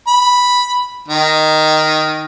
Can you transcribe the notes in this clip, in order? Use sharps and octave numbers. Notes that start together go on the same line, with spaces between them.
B5
D#3